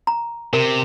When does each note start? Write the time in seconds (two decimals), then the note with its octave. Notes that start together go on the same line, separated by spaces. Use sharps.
0.07 A#5
0.53 C3 A#4